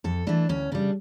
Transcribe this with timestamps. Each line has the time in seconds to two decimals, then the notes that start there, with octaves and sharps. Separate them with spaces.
0.04 F2 A4
0.27 E3 A3 D4
0.49 D2 C#4
0.72 C#3 G3 D4